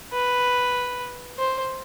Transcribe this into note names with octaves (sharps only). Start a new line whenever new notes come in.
B4
C5